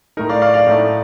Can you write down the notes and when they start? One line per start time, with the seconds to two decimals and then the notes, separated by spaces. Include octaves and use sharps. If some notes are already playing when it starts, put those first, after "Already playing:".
0.17 A2 A3 D#4 A#4
0.29 D5 F5
0.42 D5 F5
0.54 D5 F5
0.67 A2 A3 D#4